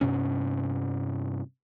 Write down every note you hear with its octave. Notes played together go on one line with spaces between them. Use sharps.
G2 C3 C#4